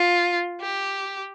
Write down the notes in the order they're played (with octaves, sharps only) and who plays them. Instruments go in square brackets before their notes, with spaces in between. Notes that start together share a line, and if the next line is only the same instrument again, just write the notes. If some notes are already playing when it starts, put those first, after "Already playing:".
Already playing: [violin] F4
G4